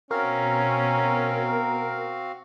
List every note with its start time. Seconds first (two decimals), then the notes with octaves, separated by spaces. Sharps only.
0.11 B2 C4 C#4 F#4 A#4 F5